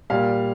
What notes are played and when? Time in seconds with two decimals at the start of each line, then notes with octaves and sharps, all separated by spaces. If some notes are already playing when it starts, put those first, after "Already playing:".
0.10 A#2 G3 F5